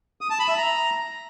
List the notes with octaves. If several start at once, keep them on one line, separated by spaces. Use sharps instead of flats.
D#6
A5
B5
E5
A#5